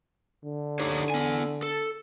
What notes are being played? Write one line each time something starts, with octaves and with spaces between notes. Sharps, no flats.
D3
D#4 G4 C#5
B3 G#5
A4